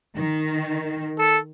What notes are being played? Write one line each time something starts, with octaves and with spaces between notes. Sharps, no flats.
D#3
A4